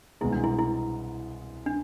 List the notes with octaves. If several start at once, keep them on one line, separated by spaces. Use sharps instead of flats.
C2 B2 G#3 E4
D4
E4
E4
D4